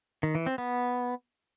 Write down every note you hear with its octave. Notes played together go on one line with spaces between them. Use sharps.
D#3
E3
C4
B3